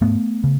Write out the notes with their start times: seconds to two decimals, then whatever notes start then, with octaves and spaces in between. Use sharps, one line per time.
0.01 G#2 A3 B3
0.44 C#3